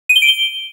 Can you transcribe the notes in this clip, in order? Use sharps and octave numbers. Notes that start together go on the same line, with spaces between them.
D#7
G7
D7
G7